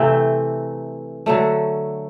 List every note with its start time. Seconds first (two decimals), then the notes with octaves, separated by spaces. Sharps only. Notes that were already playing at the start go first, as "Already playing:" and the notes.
Already playing: C3 E3 A3 C4
1.26 D3 F#3 A3